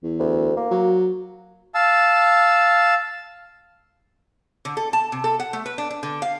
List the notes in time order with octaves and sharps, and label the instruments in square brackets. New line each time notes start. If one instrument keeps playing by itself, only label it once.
[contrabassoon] E2
[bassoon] D2
A#3
[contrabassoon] F#3
[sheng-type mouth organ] F5 A5 E6
[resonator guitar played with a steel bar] D3
A4
A5
C3
A4
F#5
A3
B4
D4
D4
D3
F5